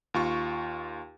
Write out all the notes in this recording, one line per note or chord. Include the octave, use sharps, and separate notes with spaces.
D#2 F4 C#6